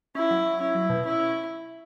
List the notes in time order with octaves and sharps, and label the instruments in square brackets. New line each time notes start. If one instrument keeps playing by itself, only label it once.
[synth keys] C#4 [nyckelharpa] E4
[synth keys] F#3
F#3
[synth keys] C#4 [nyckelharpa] E4
[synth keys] F#3
B2
[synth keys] C#4 [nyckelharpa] E4
[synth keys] C#4